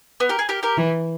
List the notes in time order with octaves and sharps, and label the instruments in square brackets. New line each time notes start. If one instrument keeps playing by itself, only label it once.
[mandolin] B3
G4 A#4
G#4
G4 A#4
G4 A#4
[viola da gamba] E3